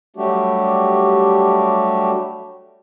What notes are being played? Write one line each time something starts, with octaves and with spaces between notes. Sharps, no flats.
F#3 G3 A3 D4 F#4 G4